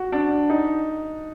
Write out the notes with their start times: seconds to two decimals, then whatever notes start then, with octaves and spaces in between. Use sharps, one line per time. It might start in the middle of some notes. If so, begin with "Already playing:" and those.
Already playing: F#4
0.12 D4
0.50 D#4